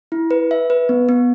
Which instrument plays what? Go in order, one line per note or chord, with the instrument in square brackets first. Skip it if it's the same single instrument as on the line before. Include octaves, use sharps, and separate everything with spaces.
[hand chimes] E4
B4
E5
B4
B3
B3